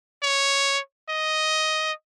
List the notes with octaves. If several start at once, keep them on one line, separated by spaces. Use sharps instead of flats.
C#5
D#5